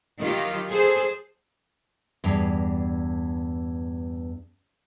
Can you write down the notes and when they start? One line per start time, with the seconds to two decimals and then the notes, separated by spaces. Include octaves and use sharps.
0.19 D#3 F#3 F4 G4
0.70 G#4 A4 C5
2.24 E2 G2